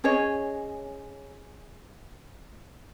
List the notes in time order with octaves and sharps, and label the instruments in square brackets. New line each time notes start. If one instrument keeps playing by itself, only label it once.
[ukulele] C#4 G#4 C#5 D#5